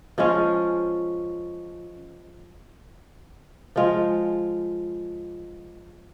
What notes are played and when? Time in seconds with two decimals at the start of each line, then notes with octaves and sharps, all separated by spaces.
0.18 F3 G#3 C#4 F4
3.76 F3 G#3 F4